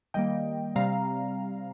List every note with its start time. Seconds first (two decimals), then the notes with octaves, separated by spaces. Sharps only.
0.14 D#3 G3 A#3 D#5 G5
0.76 C3 G3 C4 F5 A#5